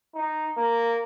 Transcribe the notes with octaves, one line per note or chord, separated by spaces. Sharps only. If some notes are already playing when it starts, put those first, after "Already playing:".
D#4
A#3